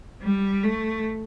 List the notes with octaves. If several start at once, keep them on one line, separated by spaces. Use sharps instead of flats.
G3
A3